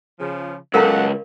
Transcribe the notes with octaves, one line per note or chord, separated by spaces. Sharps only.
C#3 F3
C#2 F#3 B3 A4 A#4 F5 F#5 A#5